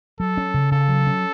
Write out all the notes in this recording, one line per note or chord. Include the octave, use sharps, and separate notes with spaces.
F#3 A4
C#4
C#3
C#3 A4
F#3
C#4